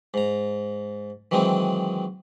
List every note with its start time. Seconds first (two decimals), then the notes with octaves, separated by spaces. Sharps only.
0.14 G#2 A#5
1.31 D#3 E3 F#3 G#3 C4 D#4